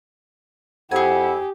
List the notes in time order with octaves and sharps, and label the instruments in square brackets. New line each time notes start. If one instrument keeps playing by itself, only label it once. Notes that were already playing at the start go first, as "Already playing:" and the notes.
[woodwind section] F2 E4 [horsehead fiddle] G4 [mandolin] G#4 G#5 [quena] F#5